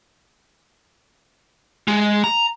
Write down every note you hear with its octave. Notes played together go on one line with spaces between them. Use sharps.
G#3
A#5